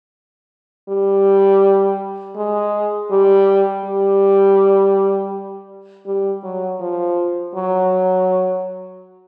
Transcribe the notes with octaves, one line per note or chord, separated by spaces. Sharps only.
G3
G#3
G3
G3
G3
F#3
F3
F#3